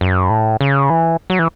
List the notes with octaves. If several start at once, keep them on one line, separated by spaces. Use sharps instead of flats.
F#2
A2
C#3
E3
F#3
E3